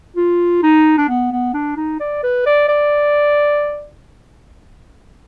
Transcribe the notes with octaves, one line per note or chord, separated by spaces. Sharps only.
F4
D#4
D4
B3
B3
D4
D#4
D5
B4
D5
D5